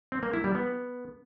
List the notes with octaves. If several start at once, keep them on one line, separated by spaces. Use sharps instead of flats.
C4
A#3
E4
G3
B3